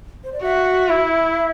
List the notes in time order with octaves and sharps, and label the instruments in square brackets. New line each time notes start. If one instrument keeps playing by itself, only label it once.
[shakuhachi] C5
D5
[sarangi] F#4 [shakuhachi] E5
[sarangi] E4